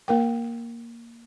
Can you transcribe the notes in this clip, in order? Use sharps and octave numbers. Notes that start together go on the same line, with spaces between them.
A#3 A#4 G5